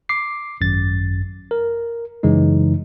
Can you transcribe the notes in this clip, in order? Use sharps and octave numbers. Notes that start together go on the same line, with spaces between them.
D6 C7
G#1 F#2 A6
A#4
F#2 C#3 E3 G#3 D#4